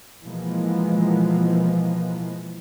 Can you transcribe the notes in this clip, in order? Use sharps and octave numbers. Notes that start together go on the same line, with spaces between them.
B2 E3 F3 G#3 A#3 B3